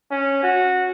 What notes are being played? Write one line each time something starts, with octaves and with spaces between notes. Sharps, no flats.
C#4
F#4